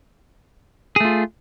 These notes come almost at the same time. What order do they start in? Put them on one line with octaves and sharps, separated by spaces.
G#4 A3 F4